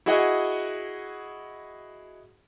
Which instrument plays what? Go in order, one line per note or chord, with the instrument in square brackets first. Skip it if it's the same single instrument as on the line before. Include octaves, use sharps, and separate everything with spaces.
[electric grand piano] E4 F#4 G#4 D#5 F#5